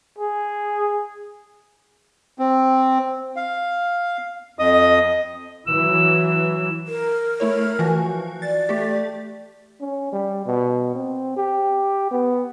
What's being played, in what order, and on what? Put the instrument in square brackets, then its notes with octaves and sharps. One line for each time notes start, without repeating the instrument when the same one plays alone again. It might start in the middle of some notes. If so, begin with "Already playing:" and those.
[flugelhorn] G#4
[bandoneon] C4
F5
F2 D#5 D#6
[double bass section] E3 F#3 [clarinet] E6
[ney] A#4
[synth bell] A3 E4 C#5
E3 F3 F#4
[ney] D5 [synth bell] A6
[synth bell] A3 G4
[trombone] C#4
G3
B2
C4
G4
B3